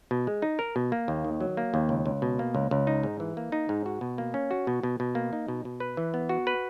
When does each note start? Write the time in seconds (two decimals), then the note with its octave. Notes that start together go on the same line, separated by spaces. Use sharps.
0.11 B2
0.27 G#3
0.42 D#4
0.59 A#4
0.76 B2
0.92 A#3
1.08 D#2
1.24 D#3
1.40 F#3
1.57 A#3
1.74 D#2
1.89 C#2
2.06 C#2
2.22 B2
2.39 A#3
2.55 C#2
2.71 C#2
2.87 D#4
3.03 G#2
3.20 E3
3.37 A#3
3.52 D#4
3.69 G#2
3.86 F#4
4.01 B2
4.18 A#3
4.34 C#4
4.51 F#4
4.67 B2
4.83 B2
5.00 B2
5.15 A#3
5.33 D#4
5.48 B2
5.65 B2
5.80 B4
5.97 E3
6.14 B3
6.29 F#4
6.47 B4